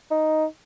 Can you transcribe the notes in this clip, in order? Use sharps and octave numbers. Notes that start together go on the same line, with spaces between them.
D#4